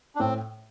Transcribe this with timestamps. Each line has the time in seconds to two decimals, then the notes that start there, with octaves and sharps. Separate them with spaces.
0.15 D4
0.20 A2 C4